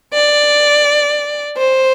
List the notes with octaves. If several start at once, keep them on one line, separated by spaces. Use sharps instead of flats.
D5
C5